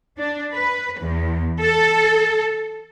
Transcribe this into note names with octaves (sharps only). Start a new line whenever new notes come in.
D4
B4
E2
A4